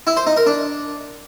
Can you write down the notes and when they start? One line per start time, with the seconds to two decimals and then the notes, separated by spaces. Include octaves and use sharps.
0.07 E4
0.17 C5
0.27 D#4
0.37 A#4
0.46 D4